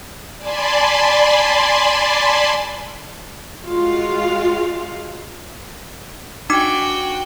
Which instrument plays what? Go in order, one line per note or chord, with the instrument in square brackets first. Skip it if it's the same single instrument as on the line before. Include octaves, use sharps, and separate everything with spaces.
[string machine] D5 G#5 A5 B5 C6
[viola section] G#3 F4 F#4 F5
[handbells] D4 D#4 D6 [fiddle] F#4 G5